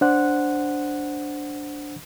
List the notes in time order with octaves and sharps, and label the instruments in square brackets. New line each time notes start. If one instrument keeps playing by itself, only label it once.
[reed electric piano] D4 C5 F#5 F#6